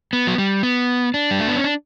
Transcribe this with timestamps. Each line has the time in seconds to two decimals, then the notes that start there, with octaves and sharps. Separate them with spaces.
0.13 B3
0.27 F#3
0.38 G3
0.63 B3
1.14 D4
1.31 G3
1.39 A3
1.48 B3
1.56 C#4
1.64 D4